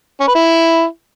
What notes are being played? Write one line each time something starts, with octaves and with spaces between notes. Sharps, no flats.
C#4
B4
E4